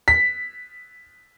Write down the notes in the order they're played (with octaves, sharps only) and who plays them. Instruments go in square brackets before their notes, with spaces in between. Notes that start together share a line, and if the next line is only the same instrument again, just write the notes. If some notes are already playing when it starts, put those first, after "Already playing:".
[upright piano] B6